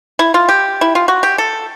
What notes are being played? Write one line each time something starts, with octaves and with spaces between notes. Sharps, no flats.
E4
F4
G4
E4
F4
F#4
G4
A4